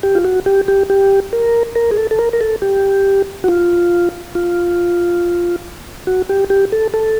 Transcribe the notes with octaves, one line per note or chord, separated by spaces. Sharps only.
G4
F4
F#4
G4
G4
G4
A#4
A#4
G#4
A4
A4
A#4
A#4
A4
G4
F#4
F4
F4
F#4
G4
G4
A4
A4